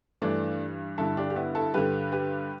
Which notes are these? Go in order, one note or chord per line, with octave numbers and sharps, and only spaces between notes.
G2 E3 A3 D4
G2 D3 E4 A4
D4 G4
G4
B3 E4
E4 A4
G2 D3 G4 B4
G4 B4